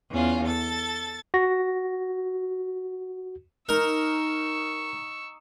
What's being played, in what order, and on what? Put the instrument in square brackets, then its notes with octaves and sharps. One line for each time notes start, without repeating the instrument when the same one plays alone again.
[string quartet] E2 C#4 F4
A4 A6
[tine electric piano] F#4 A#6
[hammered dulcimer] D#4 [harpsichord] A#4 [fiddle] C#6 E6